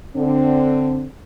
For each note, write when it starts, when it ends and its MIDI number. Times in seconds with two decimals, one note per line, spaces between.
0.16 1.05 50
0.16 1.05 60